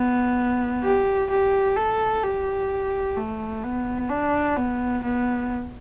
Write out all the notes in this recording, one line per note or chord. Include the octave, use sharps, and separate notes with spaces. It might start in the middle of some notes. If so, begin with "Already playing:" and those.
Already playing: B3
G4
G4
A4
G4
A3
B3
D4
B3
B3